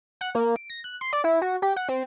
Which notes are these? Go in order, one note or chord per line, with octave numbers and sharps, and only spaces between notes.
F#5
A#3
D7
A#6
F#6
C6
D5
E4
F#4
G4
F#5
C4